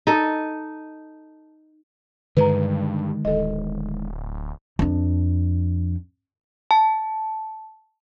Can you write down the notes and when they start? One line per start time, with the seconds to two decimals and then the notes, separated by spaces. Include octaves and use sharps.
0.07 D#4 A4
2.37 G2 D3 D#3 G#3 B4 A#5
3.25 D1 A4 D#5
4.79 F2 D4
6.71 A5